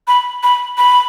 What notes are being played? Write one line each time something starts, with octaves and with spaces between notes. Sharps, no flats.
B5
B5
B5